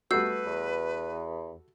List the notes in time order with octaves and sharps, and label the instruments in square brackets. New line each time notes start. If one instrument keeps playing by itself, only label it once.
[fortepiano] G3 A3 F#4 [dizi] B4 [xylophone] E6 G6 C7
[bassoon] E2